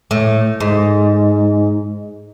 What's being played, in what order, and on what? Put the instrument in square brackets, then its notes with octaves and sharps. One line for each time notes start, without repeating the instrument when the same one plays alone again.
[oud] A2
G#2